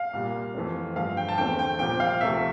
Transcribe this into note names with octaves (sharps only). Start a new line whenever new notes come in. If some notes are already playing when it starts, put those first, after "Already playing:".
Already playing: F5
C2 A#2 G3 A#3
F2 E3 A3 C4
G2 D3 F3 A3 F5
G5
A5
E2 D3 A3 C4 G5
G5
C2 A#2 F3 C4 G5
F5
D2 C3 F3 A3 E5